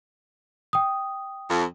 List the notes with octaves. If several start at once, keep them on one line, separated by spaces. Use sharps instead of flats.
G5 D#6
F2